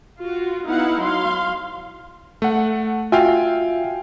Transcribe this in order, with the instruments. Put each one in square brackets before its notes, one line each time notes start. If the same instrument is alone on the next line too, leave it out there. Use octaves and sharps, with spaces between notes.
[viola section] F4 F#4
B3 D#4 E4 F5 F#5
F#3 F5 C6
[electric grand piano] A3 F#5
[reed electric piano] F4 F#4 E5 [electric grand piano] F5 G5 G#5